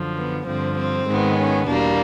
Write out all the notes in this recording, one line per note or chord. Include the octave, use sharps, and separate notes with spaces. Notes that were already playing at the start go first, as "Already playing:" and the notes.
Already playing: F#2 D3 F3
B3
G2 D3 F3 C4
C4
G#2 D#3 G#3 B3
C#4
E2 B2 G3 A#3 D4